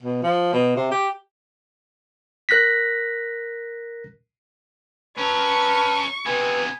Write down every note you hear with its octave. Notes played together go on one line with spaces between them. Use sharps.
B2
F3
B2
C3
G4
A#4 F#6 A#6 B6
C#4 A#4 B4 A5 C#6
C3 B3 B4 G#5